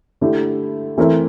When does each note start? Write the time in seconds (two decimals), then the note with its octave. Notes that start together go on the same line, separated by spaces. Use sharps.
0.21 D3 A3 E4 G4
0.98 E3 A3 C4 E4 A#4